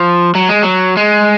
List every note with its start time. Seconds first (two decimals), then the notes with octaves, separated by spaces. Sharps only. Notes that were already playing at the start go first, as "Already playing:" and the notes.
Already playing: F3
0.35 F#3
0.49 G#3
0.63 F#3
0.97 G#3